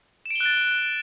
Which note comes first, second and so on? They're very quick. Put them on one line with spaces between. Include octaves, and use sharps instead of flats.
E7 D7 G7 F#6 A6